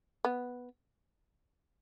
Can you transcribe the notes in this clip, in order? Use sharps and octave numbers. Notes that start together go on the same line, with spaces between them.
B3